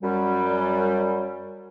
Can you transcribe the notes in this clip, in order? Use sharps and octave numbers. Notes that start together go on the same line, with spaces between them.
F#2 G3